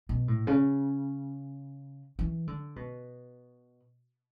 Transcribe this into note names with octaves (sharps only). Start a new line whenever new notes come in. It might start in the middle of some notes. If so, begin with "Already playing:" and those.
B2
A2
C#3
E3
D3
B2